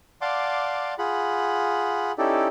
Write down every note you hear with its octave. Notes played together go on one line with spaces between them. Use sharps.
D5 F5 F#5 A5 C6 D6
F4 G#4 F#5 B5
C#4 D#4 E4 G4 A4 D5